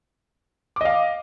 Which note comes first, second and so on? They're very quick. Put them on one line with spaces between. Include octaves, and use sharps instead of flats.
D6 D#5 F5